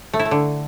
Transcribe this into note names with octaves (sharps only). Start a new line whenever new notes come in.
A3
E4
A3
D3